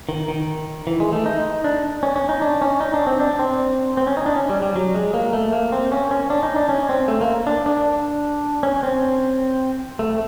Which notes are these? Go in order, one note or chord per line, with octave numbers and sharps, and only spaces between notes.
D#3
D#3
E3
G#3
A3
D#4
D4
C#4
C#4
D#4
D4
C#4
D#4
D4
C4
D4
C4
C4
C#4
D#4
D4
C#4
G3
G3
F#3
G#3
A#3
A3
A#3
C4
C#4
C#4
D4
D#4
D4
C#4
C4
A3
A#3
D4
D4
C#4
C4
A3